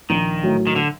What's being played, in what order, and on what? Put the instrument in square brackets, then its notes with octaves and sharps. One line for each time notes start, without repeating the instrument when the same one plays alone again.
[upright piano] A#1 [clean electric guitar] D#3
[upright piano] A2 F#3
[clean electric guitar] D#3
D3